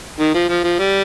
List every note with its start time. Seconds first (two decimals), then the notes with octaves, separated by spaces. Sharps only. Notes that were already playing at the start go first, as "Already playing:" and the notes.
0.20 D#3
0.35 F3
0.49 F3
0.64 F3
0.79 G3